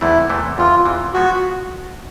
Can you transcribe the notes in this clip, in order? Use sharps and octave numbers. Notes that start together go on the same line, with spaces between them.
E2 C3 E3 A3 E4
E2 C3 E3 A3
E2 C3 E3 F4
E2 C3 E3
F3 G#3 B3 F#4